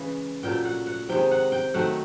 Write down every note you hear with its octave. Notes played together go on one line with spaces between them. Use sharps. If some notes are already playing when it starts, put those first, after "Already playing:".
Already playing: C#3 E3 G#3
A#2 F#3 A3 G5
F#5
F#5
C3 D#3 G#3 G5
F#5
G5
D#3 F#3 A3 F#5